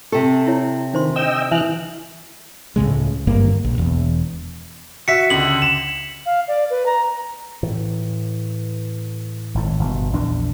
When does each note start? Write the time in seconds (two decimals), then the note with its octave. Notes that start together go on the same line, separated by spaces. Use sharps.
0.12 C3 G4 A4
0.47 E4 C#5
0.94 D#3 D4 C5 C6
1.16 D#5 G5 E6
1.51 E3 E5 G#5 F6 F#6
2.76 C#2 A2 C#3 G#3
3.27 G#1 D2 G2 A#3
3.65 A#1
3.78 E1 E2
5.08 F#4 E5 B6 C#7
5.30 C#2 D3 F#7
5.62 E7
6.26 F5
6.48 D5
6.70 B4
6.86 A#5
7.63 A2 E3
9.55 G#1 A2
9.79 G1 B2
10.13 A#1 E2 D4